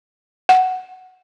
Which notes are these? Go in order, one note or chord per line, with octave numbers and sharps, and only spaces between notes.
F#5